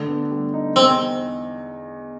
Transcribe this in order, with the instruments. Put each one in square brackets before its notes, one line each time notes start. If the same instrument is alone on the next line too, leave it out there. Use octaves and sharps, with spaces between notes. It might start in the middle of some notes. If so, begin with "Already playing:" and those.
Already playing: [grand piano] D3 A3
B3
G3
D#4
[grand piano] E2 [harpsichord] C4